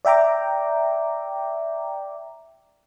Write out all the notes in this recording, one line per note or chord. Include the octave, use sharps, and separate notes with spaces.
D5 E5 G5 A#5 D6